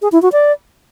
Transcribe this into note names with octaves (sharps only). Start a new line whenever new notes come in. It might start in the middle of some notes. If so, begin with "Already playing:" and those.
G#4
E4
F#4
D5